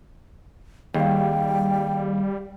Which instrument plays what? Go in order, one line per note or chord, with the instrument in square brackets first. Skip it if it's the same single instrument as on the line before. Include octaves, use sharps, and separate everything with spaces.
[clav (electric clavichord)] D#2 [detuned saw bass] G3 [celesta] G#4 F5 [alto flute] G5